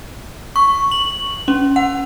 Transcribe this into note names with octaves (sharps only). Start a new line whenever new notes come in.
C#6
F#7
C#4
F#5